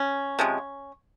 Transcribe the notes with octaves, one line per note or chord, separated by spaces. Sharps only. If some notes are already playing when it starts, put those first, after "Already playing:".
Already playing: C#4
C3 F3 G#3